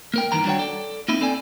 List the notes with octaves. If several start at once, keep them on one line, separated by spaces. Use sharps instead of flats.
A#3 A#4 G5
G2 D#3 E3 A#5
G3 D4 F#4 C#5 F#5 G5
A4 D5
A#3 C4 D#4 E4
C4 A4 D5 G#5